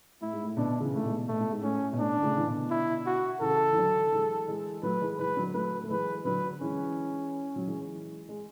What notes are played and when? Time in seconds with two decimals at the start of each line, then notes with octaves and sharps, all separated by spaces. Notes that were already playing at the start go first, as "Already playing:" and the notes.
0.21 A2 E4
0.32 G#2
0.42 A2
0.57 B2 D3 D4
0.81 C#3 E3
0.92 A2 A3
1.04 G#2 B2
1.28 B2 A3
1.39 A2
1.51 G#2
1.61 A2 C#4
1.93 B2
1.99 A2 D4
2.15 D3
2.23 A2 C#3
2.37 E3
2.47 B2 D3
2.71 E4
3.06 F#4
3.41 C#3 E3 A4
3.73 E3
3.76 D3 F#3
4.12 E3 G#3
4.48 E3 G#3
4.83 F#3 A3 B4
5.01 E3 G#3
5.19 E3 G#3 B4
5.36 D3 F#3
5.54 F#3 A3 B4
5.84 A3
5.90 E3 G#3 B4
6.25 D3 F#3 B4
6.61 E3 G#3 C#4
7.56 F#3
7.67 E3 G#3
8.29 G#3